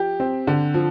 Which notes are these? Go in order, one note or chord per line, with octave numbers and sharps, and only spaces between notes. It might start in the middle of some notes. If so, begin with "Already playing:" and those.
Already playing: F3 G4
C4
D3
F3